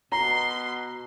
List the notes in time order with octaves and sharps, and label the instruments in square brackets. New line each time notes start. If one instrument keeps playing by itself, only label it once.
[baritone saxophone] B2 [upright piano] A#5 [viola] C6